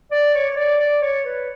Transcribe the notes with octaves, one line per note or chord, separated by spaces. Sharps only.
D5
C#5
C#5
D5
D5
C#5
B4